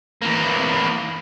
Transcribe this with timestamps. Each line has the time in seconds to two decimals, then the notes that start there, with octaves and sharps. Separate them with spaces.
0.22 E3 A#3